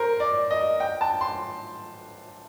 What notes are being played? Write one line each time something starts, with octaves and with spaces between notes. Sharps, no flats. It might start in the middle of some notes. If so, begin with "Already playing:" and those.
Already playing: A#4 C5
D5
D#5
G5
A5
C6